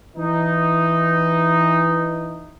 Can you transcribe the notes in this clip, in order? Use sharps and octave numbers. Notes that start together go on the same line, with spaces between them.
E3 D#4